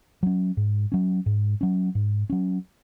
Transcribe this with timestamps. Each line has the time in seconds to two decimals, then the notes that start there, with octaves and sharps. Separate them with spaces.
0.23 F#3 C#4
0.57 G#2
0.92 F#3 C#4
1.26 G#2
1.61 F#3 C#4
1.95 G#2
2.30 F#3 C#4